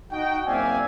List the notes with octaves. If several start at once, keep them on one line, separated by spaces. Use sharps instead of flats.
D#4 F#4 G5
F#1 C4 D5 E5 F5 G#5